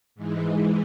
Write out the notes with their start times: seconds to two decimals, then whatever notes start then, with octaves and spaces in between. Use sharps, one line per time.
0.15 G#2 E3 G#3